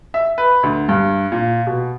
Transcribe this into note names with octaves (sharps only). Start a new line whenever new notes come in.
E5
B4
D2
G2
A#2
B2